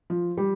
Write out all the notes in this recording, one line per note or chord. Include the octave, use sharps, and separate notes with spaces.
F3
G3